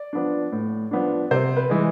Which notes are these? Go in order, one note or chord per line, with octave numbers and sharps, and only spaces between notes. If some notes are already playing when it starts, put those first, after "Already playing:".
Already playing: D5
F3 B3 D4
A2
F3 B3 D4
C3 C5
B4
E3 G#3